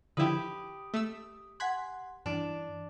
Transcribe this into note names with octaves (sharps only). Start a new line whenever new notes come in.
D3 F3 E4 G4 B4 D#6
A3 E6
F#5 G#5 C6 F#6 G#6 B6
G2 E3 D4